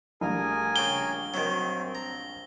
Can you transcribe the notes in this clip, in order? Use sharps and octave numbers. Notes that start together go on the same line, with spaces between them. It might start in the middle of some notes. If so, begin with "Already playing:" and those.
A#1 G3 A3 G#4 A#4 G#5
C#3 G4 G7
D#3 F#3 C4
A#5